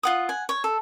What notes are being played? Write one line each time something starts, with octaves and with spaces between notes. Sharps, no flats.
F4 F#5 D#6
F#5 G#5
C#5
A4